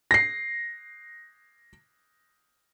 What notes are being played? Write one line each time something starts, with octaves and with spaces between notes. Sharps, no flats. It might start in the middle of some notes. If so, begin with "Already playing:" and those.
A#6 C7